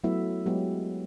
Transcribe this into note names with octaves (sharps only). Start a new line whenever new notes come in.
F#3 A3 B3 E4 E5
F#3 G#3 B3 G4